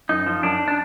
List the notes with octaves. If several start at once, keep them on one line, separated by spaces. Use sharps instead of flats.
F#2 D#4
F3
F#2 D4
D4